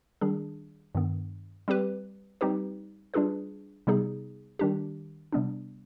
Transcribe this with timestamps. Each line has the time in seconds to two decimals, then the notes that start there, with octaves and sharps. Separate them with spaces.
0.21 D#3 G3 D4 G#4
0.95 G2 D#3 B3
1.68 G3 C4 G4 B4
2.41 G3 C4 D#4 G4 B4
3.14 G3 D4 F4 G#4 B4
3.87 C3 G3 B3 D#4 G#4
4.59 D#3 G3 D4 G4
5.33 C3 G3 B3 D4